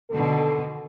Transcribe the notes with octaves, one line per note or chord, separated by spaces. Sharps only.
B2 D3 D#3 A4